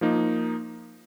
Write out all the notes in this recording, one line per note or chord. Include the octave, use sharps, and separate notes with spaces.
F3 A#3 D#4